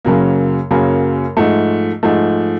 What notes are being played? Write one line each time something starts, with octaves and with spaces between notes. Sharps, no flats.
F#2 C#3 F#3 A#3
F#2 C#3 F#3 A#3
G#2 F3 A3
G#2 F3 A3